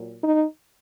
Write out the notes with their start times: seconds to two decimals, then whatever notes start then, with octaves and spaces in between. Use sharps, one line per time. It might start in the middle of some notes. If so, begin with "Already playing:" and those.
Already playing: A#2 F#3
0.21 D#4